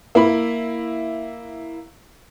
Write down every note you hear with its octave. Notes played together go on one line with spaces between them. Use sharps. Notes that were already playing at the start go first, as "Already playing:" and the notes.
A#3 E4 B5